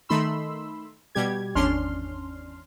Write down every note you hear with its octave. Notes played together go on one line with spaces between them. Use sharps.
D#3 A3 D#4 B5 C6 E6
B2 G3 G4 G#6
G#1 E2 C#4 D4 C6 F6